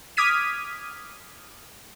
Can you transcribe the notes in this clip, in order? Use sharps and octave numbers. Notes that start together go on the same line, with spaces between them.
D6 D#6 F6 G#6 B6 D#7